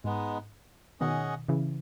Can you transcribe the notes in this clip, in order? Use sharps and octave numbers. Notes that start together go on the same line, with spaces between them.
G#2 G#3 B3 D#4
B2 D#3 C#4 G#4 D#5 F#5
C#3 E3